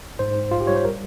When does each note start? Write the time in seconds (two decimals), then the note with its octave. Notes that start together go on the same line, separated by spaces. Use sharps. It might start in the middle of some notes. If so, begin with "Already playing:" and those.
0.19 G#2 C5
0.36 G#2
0.51 A#1 F4
0.60 G4
0.67 G3 C#5
0.76 C5
0.84 A#4